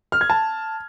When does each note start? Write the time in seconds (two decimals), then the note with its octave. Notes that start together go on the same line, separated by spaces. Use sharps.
0.12 F6
0.21 G#6
0.30 A5